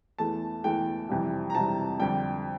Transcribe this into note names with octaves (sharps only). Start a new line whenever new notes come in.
E2 E3 A3 A5
E2 E3 A3 G5
F2 C3 E3 G3
A#5
F2 C3 E3 G3 A5
F2 D3 G3 G5